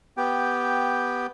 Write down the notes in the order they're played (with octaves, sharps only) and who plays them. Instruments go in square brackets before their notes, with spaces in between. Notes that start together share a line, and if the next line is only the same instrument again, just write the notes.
[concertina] B3 G4 G5